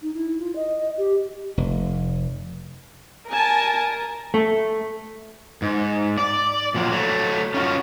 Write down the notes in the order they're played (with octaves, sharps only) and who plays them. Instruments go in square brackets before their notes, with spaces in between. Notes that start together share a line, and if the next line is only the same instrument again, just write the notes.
[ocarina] D#4
E4
F4
D#5
G4
[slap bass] F1
[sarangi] A#4 [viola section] G#5 A5
[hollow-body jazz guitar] A3
[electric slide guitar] G#2
D5
A#2 F3 F#3
F#3 A3
C#4 F4 F#4